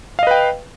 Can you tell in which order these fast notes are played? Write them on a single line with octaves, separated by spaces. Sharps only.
F5 D#5 B4 G5